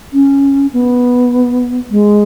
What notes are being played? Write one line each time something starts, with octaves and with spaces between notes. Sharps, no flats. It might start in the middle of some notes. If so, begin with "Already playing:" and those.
C#4
B3
G#3